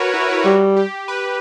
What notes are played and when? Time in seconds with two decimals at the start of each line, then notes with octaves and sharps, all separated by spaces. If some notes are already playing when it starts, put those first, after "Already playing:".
Already playing: F#4 A#4 B4 C#5
0.14 E4
0.31 E4
0.45 G3 F#4
0.76 G4
1.08 B4